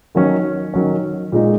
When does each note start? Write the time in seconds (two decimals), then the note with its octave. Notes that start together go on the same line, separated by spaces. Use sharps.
0.15 D#3 F#3 C#4
0.74 D#3 F#3 C#4
1.32 A#2 G#3 D#4